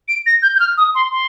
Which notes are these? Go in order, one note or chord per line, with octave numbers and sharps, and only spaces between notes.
D7
A#6
G6
G6
F6
D#6
C6
C6